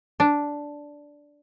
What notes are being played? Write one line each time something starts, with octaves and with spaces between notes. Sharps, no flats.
D4